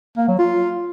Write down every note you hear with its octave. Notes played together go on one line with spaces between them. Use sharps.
A#3
F#3
F4